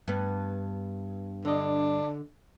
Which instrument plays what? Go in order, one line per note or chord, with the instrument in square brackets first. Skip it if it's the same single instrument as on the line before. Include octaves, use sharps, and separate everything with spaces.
[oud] G2 B3
[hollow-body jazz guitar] D3 D#5 [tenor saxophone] D4